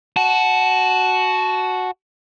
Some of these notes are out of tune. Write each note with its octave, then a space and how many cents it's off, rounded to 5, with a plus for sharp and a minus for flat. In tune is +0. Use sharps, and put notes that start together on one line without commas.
F#4 +0 A5 -20